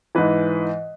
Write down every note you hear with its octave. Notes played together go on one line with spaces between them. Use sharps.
G#2 E3 B4